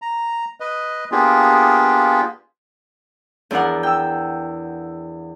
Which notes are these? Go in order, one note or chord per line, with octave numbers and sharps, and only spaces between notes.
A#5
B4 D#5
A#3 B3 D4 F4 G4 G#4
E2 F3 D4 A#4 F#5
G5 E6